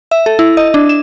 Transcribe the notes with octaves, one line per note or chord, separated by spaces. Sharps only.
E5
A4
E4
D#5
D4
E7